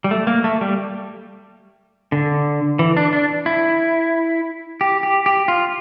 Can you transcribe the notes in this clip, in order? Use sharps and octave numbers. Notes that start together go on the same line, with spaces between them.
G3
A3
A#3
A3
G3
D3
E3
D4
D4
E4
G4
G4
G4
F4